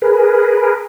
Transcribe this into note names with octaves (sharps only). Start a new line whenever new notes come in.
G#4 A#4 B4